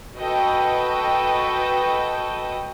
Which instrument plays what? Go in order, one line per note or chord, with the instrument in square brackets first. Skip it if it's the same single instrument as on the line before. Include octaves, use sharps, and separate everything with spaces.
[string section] F#4 A4 B4 D#5 G5